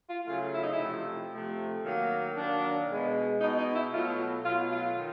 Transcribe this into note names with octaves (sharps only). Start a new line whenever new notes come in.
F4
C#3 F#3 A3 F4
E4
D#4
E4
C3 F3 A3
C3 F3 A3
D#3 F#3 A#3
D#3 F#3 A#3 D4
B2 G#3
B2 G#3 D#4
D#4
E4
B2 F#3 A3 F4
B2 F#3 A3 F4
F4
D#3